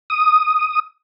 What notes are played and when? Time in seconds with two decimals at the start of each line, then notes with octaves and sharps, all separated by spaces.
0.10 D#6